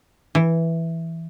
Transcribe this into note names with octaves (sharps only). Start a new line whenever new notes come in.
E3